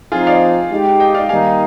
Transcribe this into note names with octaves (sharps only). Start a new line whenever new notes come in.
F3 C4 D#4 F4 G#4
D5 F5
G#3 D#4 G4
D#5 G5
D5 F5
D#3 G3 A#3 D#4 F5 G#5